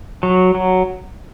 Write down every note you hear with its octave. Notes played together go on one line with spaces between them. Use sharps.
F#3
F#3